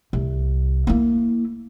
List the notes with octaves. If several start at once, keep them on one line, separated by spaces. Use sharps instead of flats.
C2
A#3 E4